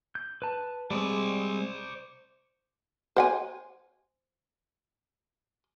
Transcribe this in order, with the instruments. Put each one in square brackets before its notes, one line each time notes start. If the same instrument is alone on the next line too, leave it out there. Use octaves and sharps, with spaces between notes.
[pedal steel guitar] G6
B4 A5
[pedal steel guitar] G3 G#3 C4 [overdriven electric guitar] C5 D5
[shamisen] C5 F#5 G#5